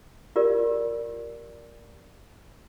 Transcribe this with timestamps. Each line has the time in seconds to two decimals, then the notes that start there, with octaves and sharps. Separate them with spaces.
0.36 F4 G4 A#4 D5